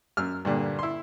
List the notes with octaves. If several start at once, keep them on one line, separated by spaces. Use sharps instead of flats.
F#2 E6 F6
G2 A#2 D3
E4 C6